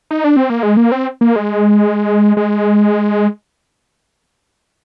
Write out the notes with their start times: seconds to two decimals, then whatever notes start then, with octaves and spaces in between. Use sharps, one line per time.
0.11 D#4
0.24 D4
0.36 C4
0.50 A#3
0.63 G#3
0.77 A#3
0.92 C4
1.21 A#3
1.36 G#3
2.37 G#3